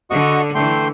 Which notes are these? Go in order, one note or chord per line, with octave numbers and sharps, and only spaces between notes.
D3 F#4 D#5 C#6
D3 E3 A3 G5 C6